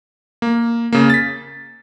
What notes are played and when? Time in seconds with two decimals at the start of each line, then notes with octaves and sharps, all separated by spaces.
0.42 A#3
0.92 C#3 A#3
1.10 A6 B6